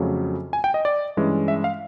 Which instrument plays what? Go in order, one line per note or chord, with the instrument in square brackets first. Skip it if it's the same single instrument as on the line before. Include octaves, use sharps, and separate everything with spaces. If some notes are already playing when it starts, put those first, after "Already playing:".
Already playing: [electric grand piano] F2 C#3 F#3 A3
G#5
G5
D#5
D5
G2 E3 G#3 C#4
E5
F5